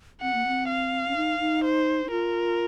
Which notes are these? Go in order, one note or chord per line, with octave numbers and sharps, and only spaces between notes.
C4 F#5
A#3
C4
F5
C#4
D#4
D#4
C5
D#4
F4 A#4